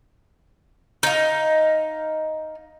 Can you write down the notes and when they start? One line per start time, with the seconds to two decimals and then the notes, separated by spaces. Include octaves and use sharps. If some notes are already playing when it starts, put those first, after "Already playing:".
1.03 D#4 F5